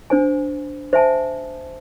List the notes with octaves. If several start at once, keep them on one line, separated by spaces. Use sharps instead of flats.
D4 C5 G#5
C5 E5 G#5 A5